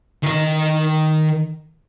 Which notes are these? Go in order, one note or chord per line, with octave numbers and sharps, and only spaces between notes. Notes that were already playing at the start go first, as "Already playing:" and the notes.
D#3 D#5